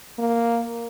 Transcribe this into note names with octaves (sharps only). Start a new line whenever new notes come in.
A#3